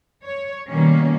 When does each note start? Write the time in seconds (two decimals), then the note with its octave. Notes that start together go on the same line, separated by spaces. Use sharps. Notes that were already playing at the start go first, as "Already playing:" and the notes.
0.25 C#5
0.69 B2 D#3 G3 A#3 C#4